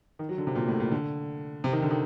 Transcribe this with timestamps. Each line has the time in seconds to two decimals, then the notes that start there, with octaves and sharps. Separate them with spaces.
0.19 D#3
0.29 F#3
0.38 D3
0.47 C3
0.55 A#2
0.68 A2
0.80 A#2
0.91 D3
1.64 C3
1.73 D#3
1.82 D3
1.91 D#3